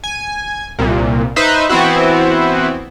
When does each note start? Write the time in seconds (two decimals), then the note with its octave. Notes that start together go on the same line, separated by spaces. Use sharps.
0.04 G#5
0.79 C2 A#2
1.36 D#4 B4 C5 E5
1.69 E3 B3 C4 E4 F#4